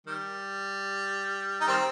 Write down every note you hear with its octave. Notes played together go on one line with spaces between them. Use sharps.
D#3 G3
D#4
D#3 G3 C4